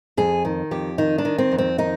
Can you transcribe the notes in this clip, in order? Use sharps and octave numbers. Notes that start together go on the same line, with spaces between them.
F2 G#4
D#3
F2 G4
D#3 D#4
D4
D#3
C4
F2
C4
D#3 D#4